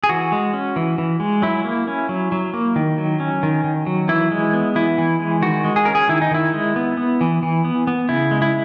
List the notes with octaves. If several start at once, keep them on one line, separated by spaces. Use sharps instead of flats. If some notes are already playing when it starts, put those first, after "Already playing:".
G#4
E3 F#4
G#3
C#4
E3
E3
G#3
F#3 E4
A#3
C#4
F#3
F#3
A#3
D#3
F#3
C#4
D#3
D#3
F#3
E3 E4
G#3
B3
E3 E4
E3
G#3
D#3 F#4
G#3
G#4
C#4 A#4
G#4
D#3 E4
D#4
D#3 E4
G#3
B3
B3
E3
E3
B3
B3
C#3 E4
G#3
E4